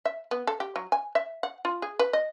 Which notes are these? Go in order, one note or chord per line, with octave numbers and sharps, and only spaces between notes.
E5
B3
A4
G4
F#3
G#5
E5
F#5
F4
G#4
B4
D#5